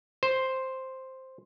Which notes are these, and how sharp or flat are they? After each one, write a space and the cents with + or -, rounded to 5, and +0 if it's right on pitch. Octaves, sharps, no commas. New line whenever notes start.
C5 +5